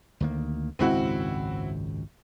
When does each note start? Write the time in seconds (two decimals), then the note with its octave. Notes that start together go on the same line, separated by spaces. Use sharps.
0.20 D2 D#3 A#3
0.79 G#1 C#2 F#2 C4 E4 F#4